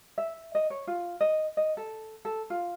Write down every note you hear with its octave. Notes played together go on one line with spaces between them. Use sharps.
E5
D#5
C#5
F4
D#5
D#5
A4
A4
F4